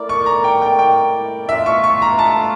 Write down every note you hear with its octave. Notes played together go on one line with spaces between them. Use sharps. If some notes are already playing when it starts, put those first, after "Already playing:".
Already playing: A3 E4 A#4 D5
C#6
A#5
G5
G5
G5
A3 D4 F4 E5
C#6
C#6
A#5
A5